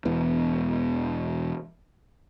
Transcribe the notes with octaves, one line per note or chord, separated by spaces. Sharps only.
E1 E2 B3